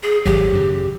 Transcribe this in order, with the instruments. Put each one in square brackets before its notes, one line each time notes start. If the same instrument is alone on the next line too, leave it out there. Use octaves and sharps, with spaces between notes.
[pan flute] G#4
[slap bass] G#1 F#3 [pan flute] G4
[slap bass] F#2 C#3